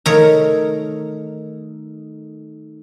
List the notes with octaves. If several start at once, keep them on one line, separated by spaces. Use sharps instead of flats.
D#3 A3 A#4 C#5 A#5